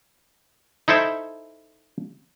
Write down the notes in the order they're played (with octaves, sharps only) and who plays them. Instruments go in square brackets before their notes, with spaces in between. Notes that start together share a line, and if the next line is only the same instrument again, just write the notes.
[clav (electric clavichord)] D#4 E4 A4 C5 E5